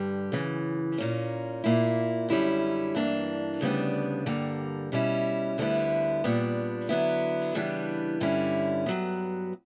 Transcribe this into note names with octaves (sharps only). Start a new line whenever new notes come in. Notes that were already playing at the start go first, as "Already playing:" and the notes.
Already playing: G2 D3 G3
F#2 C#3 E3
A#2 A#3 C#4
A#2 A#3 E4
F#2 D3 G3 C#4 E4
G2 E3 A#3 D4
D2 C#3 G3 B3 D4
G2 D3 G3 A#3
B2 G3 C#4 E4
D2 D3 G3 B3 E4
A#2 G3 B3 D4
D3 F#3 B3 E4
C#3 E3 G3 B3 D4
G2 D3 G3 C#4 E4
G2 F#3 B3